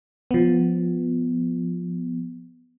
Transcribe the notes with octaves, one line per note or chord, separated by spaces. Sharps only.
F3 B3